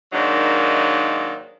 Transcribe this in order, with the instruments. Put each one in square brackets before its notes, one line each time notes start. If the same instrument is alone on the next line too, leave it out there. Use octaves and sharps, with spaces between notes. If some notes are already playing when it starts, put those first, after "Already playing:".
[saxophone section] G#2 D#3 F#3 A#3 D4 D#4